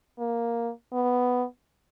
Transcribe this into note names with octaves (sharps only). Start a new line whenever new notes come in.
A#3
B3